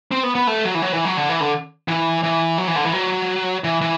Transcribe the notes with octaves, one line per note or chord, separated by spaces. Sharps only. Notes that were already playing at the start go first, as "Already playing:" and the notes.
C4
B3
B3
A3
F#3
E3
F#3
E3
F#3
D3
E3
D3
E3
E3
F#3
E3
D3
E3
F#3
E3
E3